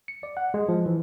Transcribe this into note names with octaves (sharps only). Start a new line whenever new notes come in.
C#7
D5
F#5
G#3
F3
E3